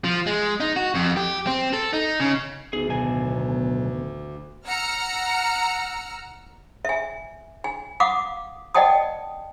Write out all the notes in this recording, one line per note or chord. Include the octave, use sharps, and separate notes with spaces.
F3
G#3
D#4
F#4
F2
G4
C4
A4
D#4
C#3
D2 B3 D#4 G#4
B1 A2 D#3 B3 G#5
F#5 A#5 E6 F6 C#7
E5 G#5
G#5
F5 F#5 D6 D#6
D5 D#5 F#5 G5 A5 D#6